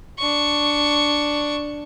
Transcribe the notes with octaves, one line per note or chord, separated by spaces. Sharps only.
D4 C#6